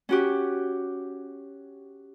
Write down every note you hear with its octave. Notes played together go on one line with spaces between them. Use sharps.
C#4 F#4 G4